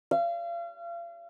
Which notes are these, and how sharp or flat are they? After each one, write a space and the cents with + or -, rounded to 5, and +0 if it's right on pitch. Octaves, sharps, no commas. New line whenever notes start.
F5 -35